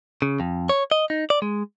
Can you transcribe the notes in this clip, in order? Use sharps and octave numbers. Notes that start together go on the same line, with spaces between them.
C#3
F2
C#5
D#5
D#4
D5
G#3